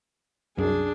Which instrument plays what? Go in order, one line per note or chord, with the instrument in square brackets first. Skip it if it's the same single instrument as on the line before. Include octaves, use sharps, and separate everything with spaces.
[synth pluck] C2 F#2 [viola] D4 G#4